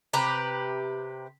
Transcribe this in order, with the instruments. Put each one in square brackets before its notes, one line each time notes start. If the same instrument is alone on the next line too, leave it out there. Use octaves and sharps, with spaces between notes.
[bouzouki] C3 G4 B4 A#5